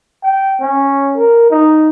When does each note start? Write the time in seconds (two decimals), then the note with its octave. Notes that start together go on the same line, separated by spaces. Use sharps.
0.23 G5
0.61 C#4
1.17 A#4
1.51 D#4